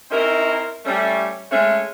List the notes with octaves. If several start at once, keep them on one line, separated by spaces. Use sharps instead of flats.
C4 C#4 D#4 E4 A#4
G3 A3 C#4
G#3 A3 C#4